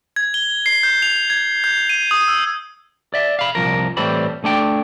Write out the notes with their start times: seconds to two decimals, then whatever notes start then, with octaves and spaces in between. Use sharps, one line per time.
0.16 G#6
0.34 G7
0.66 C7
0.83 G6
1.02 F7
1.30 G#6
1.64 G6
1.89 D#7
2.11 D#6
2.28 E6
3.14 D5 E5
3.39 F5 B5
3.55 C2 F3 A#4
3.97 A2 E3 G3 C4 B5
4.44 A3 D4 G5